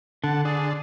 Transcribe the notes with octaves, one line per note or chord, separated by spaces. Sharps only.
D3 F#5 A5
D3 D4 G#4